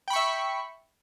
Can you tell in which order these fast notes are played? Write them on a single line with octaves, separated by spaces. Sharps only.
G5 B5 C#6 E5